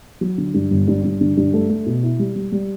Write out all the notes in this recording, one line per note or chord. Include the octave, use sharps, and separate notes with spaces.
F#3
D3
G2
G1
G2
G2
D3
G2
A3
A3
B2
E4
G3
G3
G3